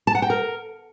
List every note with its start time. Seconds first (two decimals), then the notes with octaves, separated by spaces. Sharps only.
0.07 A5
0.15 F#5
0.22 G5
0.30 A#4